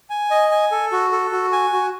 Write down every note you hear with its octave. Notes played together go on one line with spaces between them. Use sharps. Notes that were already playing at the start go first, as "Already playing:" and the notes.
G#5
D#5
G#5
A4
F#4
A4
F#4
G#5
F#4